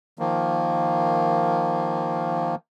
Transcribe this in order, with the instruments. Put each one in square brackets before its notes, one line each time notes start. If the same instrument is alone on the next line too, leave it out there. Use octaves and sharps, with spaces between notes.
[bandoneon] D#3 F3 A#3